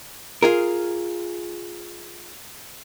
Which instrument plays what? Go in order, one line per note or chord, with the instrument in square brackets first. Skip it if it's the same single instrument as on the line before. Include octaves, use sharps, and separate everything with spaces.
[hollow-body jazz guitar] F4 G#4 A#4